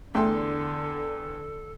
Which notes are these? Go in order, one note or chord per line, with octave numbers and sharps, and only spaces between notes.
E2 D3 A3 A4 G5 C6